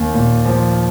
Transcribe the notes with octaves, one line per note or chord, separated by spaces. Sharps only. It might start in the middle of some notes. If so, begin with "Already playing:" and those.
Already playing: D#2
A#2
F3